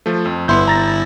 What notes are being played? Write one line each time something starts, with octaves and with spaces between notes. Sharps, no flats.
F3 A3
F2
G1 B3 E4 C6 G6
A#5 A6 A#6